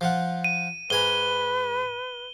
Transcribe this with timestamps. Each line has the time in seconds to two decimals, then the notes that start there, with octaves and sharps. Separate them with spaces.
0.01 F3 F4 F#5
0.44 D#7
0.90 G#2 B4 G#5 A#5 G7